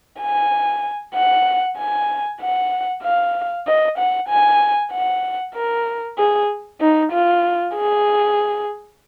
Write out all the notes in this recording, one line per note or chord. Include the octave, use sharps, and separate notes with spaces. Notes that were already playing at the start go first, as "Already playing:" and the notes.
G#5
F#5
G#5
F#5
F5
D#5
F#5
G#5
F#5
A#4
G#4
D#4
F4
G#4